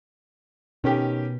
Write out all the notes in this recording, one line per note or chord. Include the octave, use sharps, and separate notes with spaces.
B2 D#3 C#4 G4